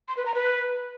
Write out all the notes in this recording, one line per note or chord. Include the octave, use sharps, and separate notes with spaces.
C6
B4
A#5
B4